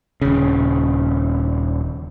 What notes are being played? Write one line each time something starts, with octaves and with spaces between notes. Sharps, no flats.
D#1 C#3